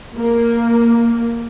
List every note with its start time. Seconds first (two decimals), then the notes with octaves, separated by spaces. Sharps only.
0.17 A#3